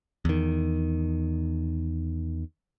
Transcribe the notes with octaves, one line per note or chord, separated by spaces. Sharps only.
E2 D#3